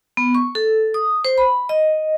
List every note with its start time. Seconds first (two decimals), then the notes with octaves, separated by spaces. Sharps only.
0.17 B3
0.35 C#6
0.55 A4
0.94 D#6
1.25 C5
1.38 B5
1.69 D#5